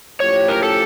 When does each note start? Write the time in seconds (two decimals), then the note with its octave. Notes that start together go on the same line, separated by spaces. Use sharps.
0.20 A2 F3 C#4 G4 C#5
0.48 A#4
0.63 A4